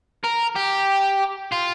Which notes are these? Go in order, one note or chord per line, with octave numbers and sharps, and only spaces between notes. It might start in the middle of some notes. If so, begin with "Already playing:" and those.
A#4
G4
F4